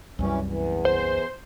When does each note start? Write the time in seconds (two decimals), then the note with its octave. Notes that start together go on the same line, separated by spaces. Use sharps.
0.19 C2 F#2 E3 G3 C#4
0.43 E2
0.85 C5